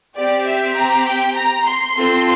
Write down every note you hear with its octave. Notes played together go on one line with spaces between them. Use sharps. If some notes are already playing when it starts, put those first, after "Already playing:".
C4 G4 D5
E5
A#5
G5
A#5
C6
C4 F4 A4